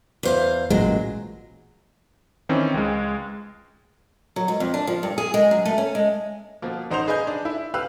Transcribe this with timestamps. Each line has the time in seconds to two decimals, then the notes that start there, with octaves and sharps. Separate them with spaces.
0.23 E2 C5 F5
0.70 A1 A#2 F#3 G#3
2.49 D#3 E3 C4 C#4
2.74 C#2 G#3
4.36 F#3
4.48 G#2
4.60 F2
4.74 D4
4.87 F3
5.03 G2
5.18 G#4
5.34 G#3
5.51 F#2
5.65 A3
5.78 C#4
5.95 G#3
6.62 B2 F3 A#3
6.91 A1 D#4 C5 F#5 C6 F7
7.08 G#4 B4 D#5 G#5 G6
7.27 D4
7.45 E4
7.74 G4 B4 F5 E6 F#6